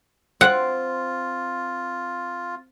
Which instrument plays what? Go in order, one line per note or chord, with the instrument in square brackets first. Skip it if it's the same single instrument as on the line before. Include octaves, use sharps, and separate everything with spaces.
[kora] C4 [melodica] F4 [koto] F#5